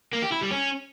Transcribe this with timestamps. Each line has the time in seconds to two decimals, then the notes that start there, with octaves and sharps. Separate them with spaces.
0.13 A#3
0.22 G4
0.32 E4
0.41 G3
0.51 C#4